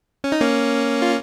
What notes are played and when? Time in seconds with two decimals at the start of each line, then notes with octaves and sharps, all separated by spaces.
0.24 C#4
0.32 D#4
0.41 A#3 C#4
1.02 F4